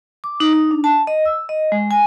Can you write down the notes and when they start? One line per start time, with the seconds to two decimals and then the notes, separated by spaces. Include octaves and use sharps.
0.24 D6
0.40 D#4
0.53 D#4
0.71 D4
0.84 A5
1.07 D#5
1.25 E6
1.49 D#5
1.72 G#3
1.91 G#5